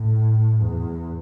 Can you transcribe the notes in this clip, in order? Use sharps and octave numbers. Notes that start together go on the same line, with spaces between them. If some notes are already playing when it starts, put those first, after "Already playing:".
Already playing: A2
E2